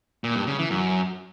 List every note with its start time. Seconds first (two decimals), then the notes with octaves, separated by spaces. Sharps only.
0.24 A#2
0.35 G2
0.47 C#3
0.59 E3
0.70 F#2